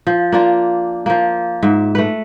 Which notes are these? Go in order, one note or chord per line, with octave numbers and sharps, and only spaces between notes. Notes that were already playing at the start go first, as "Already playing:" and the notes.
F3
A#3 D4 F4
F3 A#3
G#2 E5
A3 B4